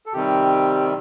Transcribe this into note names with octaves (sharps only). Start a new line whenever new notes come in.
A4
C3 D#3 G3 C4 G4